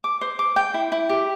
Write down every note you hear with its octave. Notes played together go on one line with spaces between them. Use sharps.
D6
C5
D6
G5
E4
E4
G4